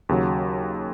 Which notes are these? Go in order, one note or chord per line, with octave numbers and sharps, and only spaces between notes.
D#2 C#3 F#3